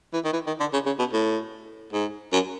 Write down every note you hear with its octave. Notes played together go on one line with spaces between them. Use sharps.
E3
D#3
E3
D#3
D3
C#3
C#3
B2
A2
G#2
F#2